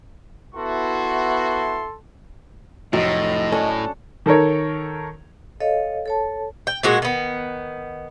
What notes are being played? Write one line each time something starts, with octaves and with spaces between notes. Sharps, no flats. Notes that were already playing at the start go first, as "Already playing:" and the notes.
B3 E4 F#4 A4 C6
F1 A2 F#3 D#5
C#4 D4 A4
D#3 A4 A#4 C#5
A4 C#5 D#5 F5
A4 C#5 A5
G5
A#2 G#3 F#4
D#3 B3